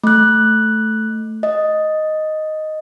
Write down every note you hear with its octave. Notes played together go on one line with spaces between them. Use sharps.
A3 F#6
D#5